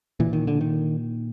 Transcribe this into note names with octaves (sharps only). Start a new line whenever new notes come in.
A#2 E3
D#3
D3
D#3